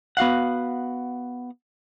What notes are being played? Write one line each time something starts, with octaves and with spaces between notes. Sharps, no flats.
B3 F#4 F5 F#5